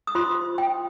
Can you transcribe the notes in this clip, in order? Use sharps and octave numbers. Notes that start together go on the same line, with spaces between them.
D#6
F4 C5 C6
G5